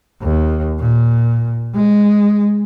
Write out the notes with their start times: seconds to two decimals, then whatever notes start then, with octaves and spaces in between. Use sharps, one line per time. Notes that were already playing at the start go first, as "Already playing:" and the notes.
0.22 D#2
0.81 A#2
1.75 G#3